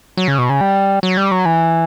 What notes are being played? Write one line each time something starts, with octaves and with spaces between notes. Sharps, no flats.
F#3
C#3
B2
C#3
G3
F#3
G3
F#3
E3